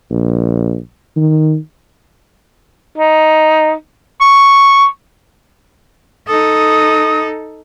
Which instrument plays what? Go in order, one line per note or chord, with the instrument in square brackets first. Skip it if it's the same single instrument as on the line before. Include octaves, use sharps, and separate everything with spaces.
[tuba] A#1
D#3
[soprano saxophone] D#4
C#6
[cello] D#4 A4 [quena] D#6